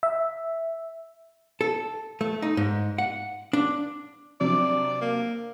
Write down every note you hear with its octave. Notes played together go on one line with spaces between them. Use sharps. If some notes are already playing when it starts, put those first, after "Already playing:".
E5
A4
A3
D#4
G#2
F#5
D4
C3 F#3 D4 D5
A#3